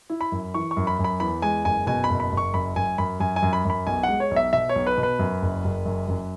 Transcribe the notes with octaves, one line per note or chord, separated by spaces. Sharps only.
E4
B5
F#2
E3 C#6
C#6
F#2
B5
F#2
B5
E2 B5
G#3 G#5
F#1 G#5
B2 G#5
B5
F#1
B5
F#1
C#6
F#2 B5
F#2 G#5
F#2 B5
F#2 G#5
G#5
F#2
B5
F#2 B5
B1 G#5
F#5
G#3
C#5
B1
E5
B2 E5
C#5
B1
B4
B2
B4
F#2
F#1
F#1
F#2
F#2